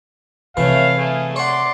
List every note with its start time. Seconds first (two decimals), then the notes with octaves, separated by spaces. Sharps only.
0.57 C3 E3 A3 C#5 F5
0.97 A3 G#4
1.36 C#5 D5 F#5 C6